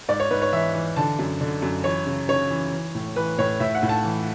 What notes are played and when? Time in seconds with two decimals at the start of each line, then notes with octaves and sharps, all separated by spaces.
0.09 G#2 D5
0.20 C#5
0.31 G#2 B4
0.42 C#5
0.53 E3 E5
0.75 E3
0.96 D3 A5
1.19 F#2
1.41 D3
1.62 F#2
1.84 E3 C#5
2.06 C#3
2.29 C#3 C#5
2.50 E3
2.72 E3
2.95 A2
3.16 E3 B4
3.38 A2 C#5
3.60 A2 E5
3.75 F#5
3.83 A2
3.89 A5
4.04 E3